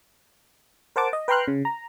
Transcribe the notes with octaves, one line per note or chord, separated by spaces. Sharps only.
A#4 C5 F#5 A5 D6
D#5
B4 G5 A#5 C6 F6 F#6
C#3
A#5